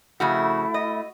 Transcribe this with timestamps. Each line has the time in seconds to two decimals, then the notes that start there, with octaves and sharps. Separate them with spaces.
0.20 F2 C#3 A3 E4 F#4
0.74 D#5